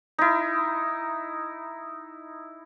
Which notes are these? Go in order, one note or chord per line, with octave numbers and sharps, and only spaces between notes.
D#4 E4